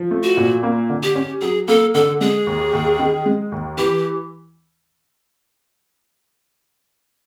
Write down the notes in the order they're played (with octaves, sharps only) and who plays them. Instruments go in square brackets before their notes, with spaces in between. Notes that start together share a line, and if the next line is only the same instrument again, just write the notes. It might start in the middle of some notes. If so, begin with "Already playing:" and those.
Already playing: [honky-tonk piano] F3
A3
[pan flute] F#4
[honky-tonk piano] A#2
A#3
D3
[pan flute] G4
[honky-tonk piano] C#4
[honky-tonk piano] F#3 [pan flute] G#4
[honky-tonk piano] A#3 [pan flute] A4
[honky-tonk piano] D3 [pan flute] A4
[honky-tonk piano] G#3 [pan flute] G#4
[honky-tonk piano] D#2
D#2
D#3
G#3
D#2
[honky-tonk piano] E3 [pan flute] G4